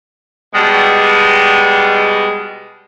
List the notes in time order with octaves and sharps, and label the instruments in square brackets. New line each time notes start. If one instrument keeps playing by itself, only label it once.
[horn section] B2 G3 G#3